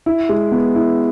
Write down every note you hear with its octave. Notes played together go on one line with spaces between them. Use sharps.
E4
G#3
B3
E4